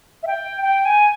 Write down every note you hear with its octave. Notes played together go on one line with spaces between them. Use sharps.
E5
G5
G5
G#5